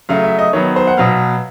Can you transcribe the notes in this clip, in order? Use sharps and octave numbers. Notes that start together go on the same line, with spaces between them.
C#3 F#3 A3 F5
E5
D#5
D#3 F#3 B3 C#5
C5
F#5
B2 F#3 B3 F5